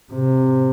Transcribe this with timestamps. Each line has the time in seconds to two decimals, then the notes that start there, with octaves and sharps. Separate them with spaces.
0.13 C3